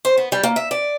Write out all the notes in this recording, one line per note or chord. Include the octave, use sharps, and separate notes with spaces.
C5
B3
G3
A#3
E5
D5